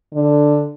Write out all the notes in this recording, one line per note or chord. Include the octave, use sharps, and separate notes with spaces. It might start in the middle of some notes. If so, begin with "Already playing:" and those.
D3